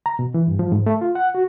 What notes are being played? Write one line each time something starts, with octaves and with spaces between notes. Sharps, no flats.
A#5
B2
E3
G2
F3
G#2
A3
F4
F#5
F#4